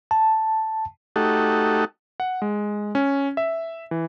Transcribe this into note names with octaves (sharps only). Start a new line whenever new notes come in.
A5
A3 D#4 F#4 G4 A4
F#5
G#3
C#4
E5
E3